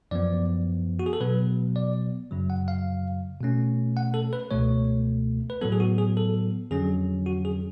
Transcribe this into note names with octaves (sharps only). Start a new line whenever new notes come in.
F#2 F3 B3 D5
F#4
G#4
A4
B2 F#3 B3 B4
D5
F#2 C#3 F#3
F#5
F5
B2 A3 C#4
F#5
A4
B4
C#2 B2 A3 C#5
B4
A2 F#3 B3 A4
G#4
F#4
G#4
A4
F2 D3 F#3 C#4 G#4
F#4
G#4